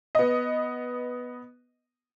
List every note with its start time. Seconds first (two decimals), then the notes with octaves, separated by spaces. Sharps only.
0.15 B3 D#5